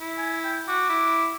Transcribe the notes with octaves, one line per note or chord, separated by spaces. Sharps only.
E4
G#5
G5
F#4 D6
E4